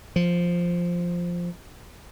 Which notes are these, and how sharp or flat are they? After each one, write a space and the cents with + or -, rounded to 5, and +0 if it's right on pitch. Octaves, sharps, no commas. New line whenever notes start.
F3 +0